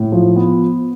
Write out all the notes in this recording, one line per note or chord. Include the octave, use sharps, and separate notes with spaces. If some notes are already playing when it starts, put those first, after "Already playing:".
Already playing: A2
F3
B3